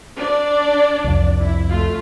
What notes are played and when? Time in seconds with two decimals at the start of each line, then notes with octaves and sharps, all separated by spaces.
0.18 D4 D5
1.04 C2 F2
1.41 E4
1.71 A3 F4